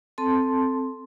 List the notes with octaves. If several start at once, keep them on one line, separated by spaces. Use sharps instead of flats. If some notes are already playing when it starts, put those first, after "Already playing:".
C4 A4 A5 C6